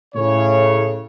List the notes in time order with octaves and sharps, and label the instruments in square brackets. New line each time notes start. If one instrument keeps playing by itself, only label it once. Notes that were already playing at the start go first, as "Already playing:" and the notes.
[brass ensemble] A2 C#3 C#5